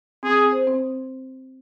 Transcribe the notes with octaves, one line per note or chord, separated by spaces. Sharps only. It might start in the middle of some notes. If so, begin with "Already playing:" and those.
C4 G#4
C4
C5
C4